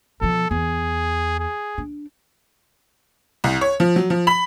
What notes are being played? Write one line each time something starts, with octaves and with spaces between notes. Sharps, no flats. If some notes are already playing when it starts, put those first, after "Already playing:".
B2 F3 A4
E2 G#4
G#4
D4
C2
C#5
F3
F#3
F3
B5